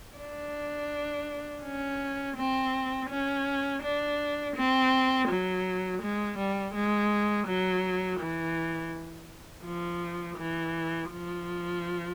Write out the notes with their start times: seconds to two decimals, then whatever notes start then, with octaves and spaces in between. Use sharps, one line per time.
0.19 D4
1.64 C#4
2.37 C4
3.10 C#4
3.82 D4
4.56 C4
5.28 F#3
6.02 G#3
6.38 G3
6.74 G#3
7.47 F#3
8.20 E3
9.65 F3
10.38 E3
11.11 F3